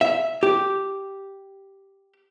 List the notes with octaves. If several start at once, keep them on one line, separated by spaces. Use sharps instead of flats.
E5
G4